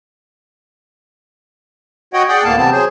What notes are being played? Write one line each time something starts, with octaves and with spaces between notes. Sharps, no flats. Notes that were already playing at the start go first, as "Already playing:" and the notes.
F#4 C#5 D#5 F#5 G5
G#4 D5 F#5 G5
D2 A2 A#3 B3 F5 A5
C3 E3 G3 B3 C4 A5
F#3 G#4 C5